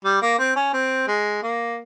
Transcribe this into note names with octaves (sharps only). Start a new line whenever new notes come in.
G3
A#3
C4
C#4
C4
G#3
A#3